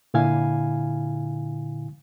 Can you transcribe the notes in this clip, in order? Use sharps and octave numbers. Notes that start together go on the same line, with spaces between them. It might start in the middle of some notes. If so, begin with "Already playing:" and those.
A#2 D3 E4 F5 G#5